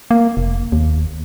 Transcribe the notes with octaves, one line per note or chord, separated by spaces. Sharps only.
A#3
F1
D#2